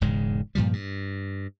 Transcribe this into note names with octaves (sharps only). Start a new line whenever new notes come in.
E1 G#2 C#3 G#3
G2 A#2 F3 G3
G2